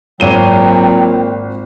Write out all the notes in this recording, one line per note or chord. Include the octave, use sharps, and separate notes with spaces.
G#1 A#2 F#3 G5 D#7 G7